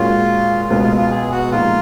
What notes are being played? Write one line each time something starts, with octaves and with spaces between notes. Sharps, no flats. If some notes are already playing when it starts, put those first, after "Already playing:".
Already playing: A#2 G#3 C#4 F4 F#4
C#2 B2 G#3 B3 F4
F4
F4
G#4
F#4
A#2 F3 G#3 D#4 F4 A#4